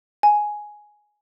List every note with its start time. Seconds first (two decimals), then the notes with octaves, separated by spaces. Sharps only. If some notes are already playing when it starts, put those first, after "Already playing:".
0.23 G#5